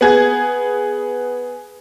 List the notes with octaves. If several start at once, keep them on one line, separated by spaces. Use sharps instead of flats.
B3 G#4 G#6